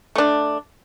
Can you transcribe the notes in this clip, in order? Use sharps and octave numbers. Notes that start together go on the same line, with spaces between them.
A3 D4